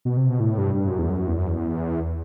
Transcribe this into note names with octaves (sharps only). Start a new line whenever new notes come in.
B2
C3
B2
A2
G2
G2
F#2
E2
F#2
E2
F#2
E2